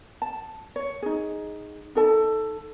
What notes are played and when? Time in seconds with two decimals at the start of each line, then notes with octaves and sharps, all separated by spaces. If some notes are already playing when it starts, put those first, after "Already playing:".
0.22 A5
0.76 C#5
1.02 D#4 G#4
1.95 D#4 A4 A5